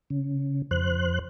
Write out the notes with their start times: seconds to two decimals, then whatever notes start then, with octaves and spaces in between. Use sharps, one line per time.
0.10 C#3
0.71 F2 C5 F#6